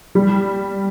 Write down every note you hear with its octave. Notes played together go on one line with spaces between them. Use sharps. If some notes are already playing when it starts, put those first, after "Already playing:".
G3